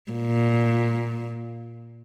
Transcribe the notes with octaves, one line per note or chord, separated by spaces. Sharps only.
A#2